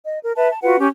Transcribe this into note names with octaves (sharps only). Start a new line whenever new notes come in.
D#5
A#4
B4 E5 A5
A5
F4 F#4 B4 F#5
C#4 G4